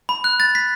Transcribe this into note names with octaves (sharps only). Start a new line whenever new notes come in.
B5
F#6
A6
B6